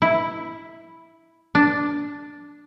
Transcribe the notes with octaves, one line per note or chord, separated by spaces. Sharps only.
E4
D4